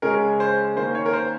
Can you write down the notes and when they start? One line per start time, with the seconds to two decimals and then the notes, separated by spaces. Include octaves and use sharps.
0.02 C#3 G#3 C#4 A#4
0.40 C5
0.76 D#3 A#3 C#4 C5
0.95 C#5
1.06 A#4
1.13 C5